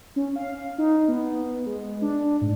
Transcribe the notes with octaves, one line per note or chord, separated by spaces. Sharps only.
C#4
F5
D#4
B3
G#3
D4
G#2